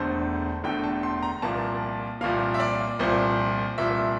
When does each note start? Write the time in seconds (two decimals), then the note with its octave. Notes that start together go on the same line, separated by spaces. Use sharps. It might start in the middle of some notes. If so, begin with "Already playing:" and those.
Already playing: E1 E2 D3 A3 C5
0.64 E1 E2 D3 A3 G5
0.84 A5
1.03 C6
1.23 A#5
1.42 C2 A#2 F3 A#3 A5
2.21 C2 A#2 F3 A#3 F5
2.54 E5
2.60 D5
2.99 C2 A#2 F3 C5
3.78 C2 A#2 F3 E5